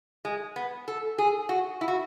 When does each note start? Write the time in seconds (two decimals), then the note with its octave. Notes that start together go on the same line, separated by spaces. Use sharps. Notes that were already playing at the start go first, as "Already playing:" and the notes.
0.25 G#3
0.56 B3
0.88 A4
1.18 G#4
1.49 F#4
1.81 E4
1.88 F#4